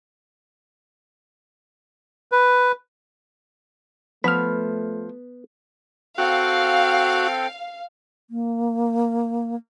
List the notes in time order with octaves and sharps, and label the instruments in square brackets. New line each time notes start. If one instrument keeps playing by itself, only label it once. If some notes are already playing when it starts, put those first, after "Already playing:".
[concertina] B4
[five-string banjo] F3 [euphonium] A3 [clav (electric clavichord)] B3 [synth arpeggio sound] B5 F6
[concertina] C4 A4 G5 [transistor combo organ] F#4 [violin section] F5
[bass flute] A#3